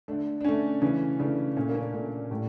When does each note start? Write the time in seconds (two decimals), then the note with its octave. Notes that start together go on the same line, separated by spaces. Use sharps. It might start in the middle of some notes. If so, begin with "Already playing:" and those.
0.08 D3 A3 D4
0.41 D4
0.45 D3 A3 C#4
0.82 C#3 E3 A3 C#4
1.20 C#3 E3 A3 D4
1.57 A#2 A3 C#4
1.69 A#3
1.75 C#4
1.81 D4
1.94 A#2 A3
2.30 A2 G3